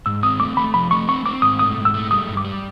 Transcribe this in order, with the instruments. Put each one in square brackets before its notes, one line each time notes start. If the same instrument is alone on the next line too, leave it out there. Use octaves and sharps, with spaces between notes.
[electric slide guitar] G#2 [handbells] E6
[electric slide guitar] C4 [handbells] D#6
[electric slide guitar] A3 [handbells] D6
[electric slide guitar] A3 [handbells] B5
[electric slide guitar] F3 [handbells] B5
[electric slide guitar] A3 [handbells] C#6
[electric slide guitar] C4 [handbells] C#6
[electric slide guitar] C4 [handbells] D6
[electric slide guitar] G#2 [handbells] D#6
[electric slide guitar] A3 [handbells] D#6
[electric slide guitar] G#2
[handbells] E6
[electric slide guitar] A3
[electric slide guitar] G3 [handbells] D#6
[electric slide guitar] G2
[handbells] D6
[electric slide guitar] G3